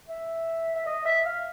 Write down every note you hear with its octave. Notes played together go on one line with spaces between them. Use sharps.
E5
E5
D#5
E5
F5